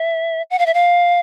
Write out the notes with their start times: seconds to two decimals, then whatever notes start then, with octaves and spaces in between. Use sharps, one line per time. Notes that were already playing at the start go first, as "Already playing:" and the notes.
Already playing: E5
0.50 F#5
0.59 F5
0.66 E5
0.74 F5